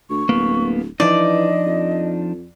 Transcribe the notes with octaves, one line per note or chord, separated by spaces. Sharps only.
D2 C#6
D1 A#3 B3
E3 F3 D4 D#4 D5 D#5
F2